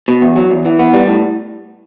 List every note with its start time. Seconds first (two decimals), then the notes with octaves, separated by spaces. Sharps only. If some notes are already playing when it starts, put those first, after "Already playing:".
0.08 B2
0.22 E2
0.36 F#3
0.50 E2
0.65 E3
0.79 B3
0.94 G3
1.07 A2